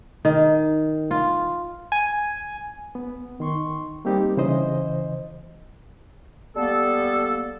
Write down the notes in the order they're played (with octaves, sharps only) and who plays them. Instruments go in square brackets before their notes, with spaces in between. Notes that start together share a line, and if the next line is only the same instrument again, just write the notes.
[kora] D#3
F4
[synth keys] G#5
[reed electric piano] B3
D#3 C6 C#6
G3 A#3 C4 D#4 G4
C#3 E3 C5 D#5
[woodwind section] G3 A#3 B3 A4